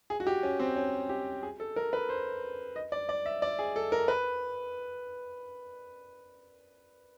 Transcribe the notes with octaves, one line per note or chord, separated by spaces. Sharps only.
G#4
F#4
G4
C#4
C4
C#4
G4
G#4
A4
A#4
B4
C5
D#5
D5
D5
E5
D5
G#4
A4
A#4
B4